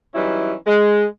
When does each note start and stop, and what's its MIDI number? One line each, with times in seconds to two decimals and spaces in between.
0.15 0.53 52
0.15 0.53 54
0.15 0.53 55
0.15 0.53 61
0.15 0.53 63
0.15 0.53 64
0.66 1.04 56